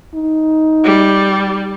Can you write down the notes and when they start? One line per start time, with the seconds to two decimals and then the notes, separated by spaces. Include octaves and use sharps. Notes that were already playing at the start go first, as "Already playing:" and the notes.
0.14 D#4
0.84 G3